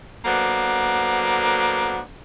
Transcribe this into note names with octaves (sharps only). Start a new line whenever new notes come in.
F#3 A#3 B3 D4 A4 C5